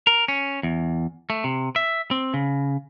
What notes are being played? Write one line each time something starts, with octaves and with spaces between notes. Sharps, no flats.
A#4
C#4
E2
A3
C3
E5
C4
C#3